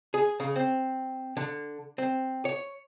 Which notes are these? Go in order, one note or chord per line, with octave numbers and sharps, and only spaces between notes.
G#4
C#3
C4
D3
C4
C#5